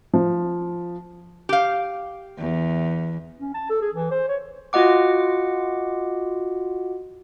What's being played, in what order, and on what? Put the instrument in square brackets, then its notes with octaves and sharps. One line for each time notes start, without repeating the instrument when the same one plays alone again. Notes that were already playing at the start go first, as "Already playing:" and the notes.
[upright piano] F3
[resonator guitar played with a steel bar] G4 F5
[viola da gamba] E2
[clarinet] C#4
A5
A4
G#4
E3
C5
C#5
[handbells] F4 F#4 D#5 F#5 D6